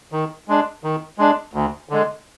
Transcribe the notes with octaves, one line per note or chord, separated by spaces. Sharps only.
D#3
G#3 D4
D#3
G#3 D4
D2
D3 G#3